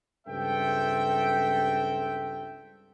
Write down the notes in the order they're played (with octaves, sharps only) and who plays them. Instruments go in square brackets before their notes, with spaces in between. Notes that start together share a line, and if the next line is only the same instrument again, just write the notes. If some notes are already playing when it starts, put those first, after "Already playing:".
[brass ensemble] C#2 G2 C4 A4 E5 G5